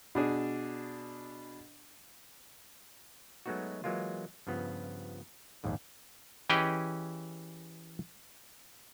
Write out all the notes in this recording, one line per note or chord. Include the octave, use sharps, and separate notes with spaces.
B2 D4 G#4
F#3 G#3 A3 B3 D#4 F#4
E3 F#3 G#3 A#3 F4
G2 C#3 F3 B3
A#1 D#2 G#2 D#3
E3 C#4 G4 G#4 D#5 G5